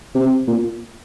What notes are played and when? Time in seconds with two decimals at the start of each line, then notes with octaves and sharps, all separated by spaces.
0.15 C3
0.47 A#2